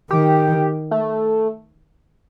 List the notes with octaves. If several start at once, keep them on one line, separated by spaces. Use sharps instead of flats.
D#3 G4
A3